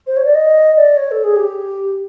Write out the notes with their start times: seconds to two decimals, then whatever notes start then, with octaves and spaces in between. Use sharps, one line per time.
0.07 C5
0.17 C#5
0.25 D5
0.35 D#5
0.76 D5
0.96 C#5
1.11 A4
1.24 G#4
1.36 G4